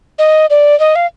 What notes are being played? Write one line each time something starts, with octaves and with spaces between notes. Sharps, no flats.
D#5
D5
D#5
F5